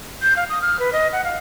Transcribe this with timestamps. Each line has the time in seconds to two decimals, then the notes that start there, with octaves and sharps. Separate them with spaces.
0.22 G6
0.36 F5
0.49 D#6
0.62 F6
0.79 B4
0.93 D#5
1.13 F#5
1.24 F5